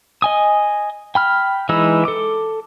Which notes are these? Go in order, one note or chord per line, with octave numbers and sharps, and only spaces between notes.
D#5 G#5 D#6
G5 B5 F6
E3 G#3 D#4 B5 E6
A4 D6